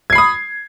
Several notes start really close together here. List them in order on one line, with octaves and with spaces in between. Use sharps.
G#6 C7 B5 D#6